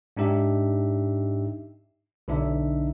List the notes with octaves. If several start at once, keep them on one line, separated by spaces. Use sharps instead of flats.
G#2 D4 D#4 G4 E5
B1 D3 D4 D#4 E5